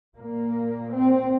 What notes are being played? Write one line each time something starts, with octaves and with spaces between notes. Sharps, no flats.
A#2 A#3
C4